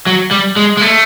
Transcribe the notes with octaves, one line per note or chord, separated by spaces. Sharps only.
F#3
G3
G#3
G#3
A3